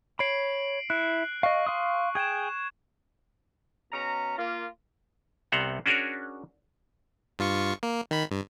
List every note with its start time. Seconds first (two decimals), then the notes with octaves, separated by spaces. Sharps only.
0.19 C#5 B5 C7 D7 F#7
0.90 E4 F#6
1.43 D#5 F5 C#6
1.67 F5 C6 D#6
2.15 G#4 G5 G#6 E7
3.92 B2 C#4 A#5
4.39 A#3 F4
5.52 C2 C3 B3 C5 F#5 A#5
5.86 C#4 D4 F#4 G#4 A#4 C#5
7.39 G2 F4 C#6
7.83 A#3
8.11 D#3 B5
8.31 G2